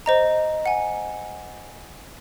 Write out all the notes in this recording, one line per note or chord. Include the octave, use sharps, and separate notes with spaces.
C5 D#5 A#5
F#5 G#5